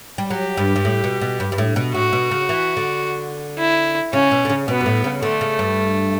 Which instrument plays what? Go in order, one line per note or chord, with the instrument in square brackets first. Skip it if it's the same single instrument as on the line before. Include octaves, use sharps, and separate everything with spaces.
[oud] G3
[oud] F#3 [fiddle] G4
[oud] G2
G2
A2
B2
B2
G2
G2
A2
B2
[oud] A2 [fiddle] F#4
[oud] B2
C#3
E3
D3
[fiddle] E4
[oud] C#3 [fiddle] C#4
[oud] B2
D3
C#3
[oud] B2 [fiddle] B3
[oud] G2
A2
C#3
[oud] D3 [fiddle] A3
[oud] C#3
G2